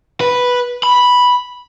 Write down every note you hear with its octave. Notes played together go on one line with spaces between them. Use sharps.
B4
B5